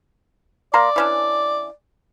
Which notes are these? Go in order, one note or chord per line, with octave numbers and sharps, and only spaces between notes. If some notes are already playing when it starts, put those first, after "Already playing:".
A#3 D5 A#5 C6
E3 C#4 D4